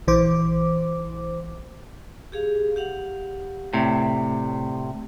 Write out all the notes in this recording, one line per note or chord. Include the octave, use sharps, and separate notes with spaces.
A#1 E3 C5 D6
G4 G#4 F5
G4 F5 F#5
A2 C3 D5